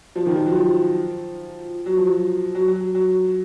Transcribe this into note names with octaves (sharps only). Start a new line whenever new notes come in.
F3
D#3
F3
F#3
F3
F#3
F3
F#3
F#3
F#3
F#3